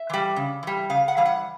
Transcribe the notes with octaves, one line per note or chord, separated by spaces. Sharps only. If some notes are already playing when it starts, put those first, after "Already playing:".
Already playing: E5
E3 G3
C#3
E3 G3
C#3 F5
F#5
E3 G3 F5
F#5